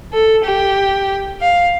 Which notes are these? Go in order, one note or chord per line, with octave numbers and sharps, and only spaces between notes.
A4
G4
F5